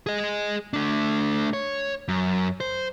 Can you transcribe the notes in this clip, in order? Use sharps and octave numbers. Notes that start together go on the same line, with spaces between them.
G#4 D#5
A3 D4
C#5
F#2
C5